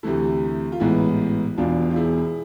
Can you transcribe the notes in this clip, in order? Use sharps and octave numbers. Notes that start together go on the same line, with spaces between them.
D2 C3 E3 A3 E4
F4
A1 G#2 E3 B3 E4
E1 E2 B2 D4 F4
F4
E4 G#4